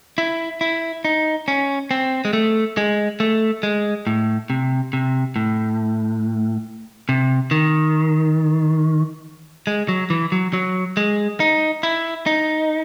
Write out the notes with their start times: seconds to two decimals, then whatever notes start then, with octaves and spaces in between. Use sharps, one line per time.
0.18 E4
0.61 E4
1.05 D#4
1.48 C#4
1.91 C4
2.25 G#3
2.33 A3
2.77 G#3
3.20 A3
3.63 G#3
4.07 A2
4.50 C3
4.93 C3
5.36 A2
7.09 C3
7.51 D#3
9.67 G#3
9.88 F#3
10.10 E3
10.32 F#3
10.53 F#3
10.97 G#3
11.40 D#4
11.83 E4
12.26 D#4